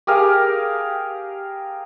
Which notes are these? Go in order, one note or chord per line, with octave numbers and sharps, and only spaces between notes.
G4 G#4 A#4 F5